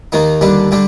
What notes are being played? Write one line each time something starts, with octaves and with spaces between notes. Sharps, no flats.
D#2 D#3 A#3 D#4
D#2 D3 G3 D4
D3 G3 D4